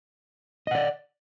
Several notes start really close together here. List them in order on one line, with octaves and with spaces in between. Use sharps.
D#5 F#5 D5